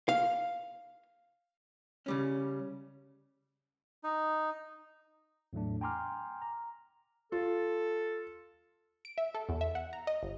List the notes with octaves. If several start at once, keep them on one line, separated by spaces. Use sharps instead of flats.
F5
C#3 G3 C#4
D#4
E2 A2 F#3 A3 D4
G5 G#5 A#5 C6 D6 F6
A#5
F4 A4
D7
E5
A4
E2
E5
F#5
A#5
D#5
G1